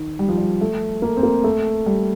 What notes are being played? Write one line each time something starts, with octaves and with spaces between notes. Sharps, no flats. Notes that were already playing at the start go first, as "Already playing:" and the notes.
Already playing: D#3
G3
F3
G3
A3
A#3
C4
A#3
A3
G3